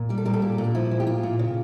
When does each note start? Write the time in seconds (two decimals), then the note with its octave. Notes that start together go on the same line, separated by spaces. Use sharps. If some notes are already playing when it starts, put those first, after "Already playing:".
Already playing: A#2
0.09 G3 G4
0.18 A4
0.25 G3 A#4
0.34 A4
0.42 A#2 G4
0.58 A#2
0.64 D4
0.75 F3 E4
0.91 F3
1.00 G4
1.07 A#2 F4
1.23 A#2
1.39 C#3